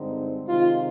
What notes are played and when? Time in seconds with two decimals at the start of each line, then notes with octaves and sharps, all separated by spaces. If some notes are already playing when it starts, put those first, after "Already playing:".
Already playing: G2 D3 G#3 C4 D#4
0.47 C3 D#3 G#3 D#4 F4